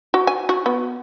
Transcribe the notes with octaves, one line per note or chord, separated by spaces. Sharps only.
F#4
G#5
F#4
B3